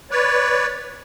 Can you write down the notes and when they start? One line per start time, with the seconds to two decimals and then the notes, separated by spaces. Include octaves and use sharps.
0.11 B4 C#5 D5